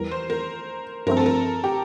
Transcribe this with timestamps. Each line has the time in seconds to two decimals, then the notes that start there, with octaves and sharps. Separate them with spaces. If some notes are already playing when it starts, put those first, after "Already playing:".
Already playing: E2 E3 G3 A#4
0.11 C5
0.30 A#4
1.06 G2 F3 A3 C4 A#4
1.17 A4
1.26 A#4
1.64 G4